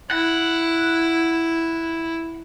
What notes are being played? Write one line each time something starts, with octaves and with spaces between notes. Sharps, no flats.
E4 F#5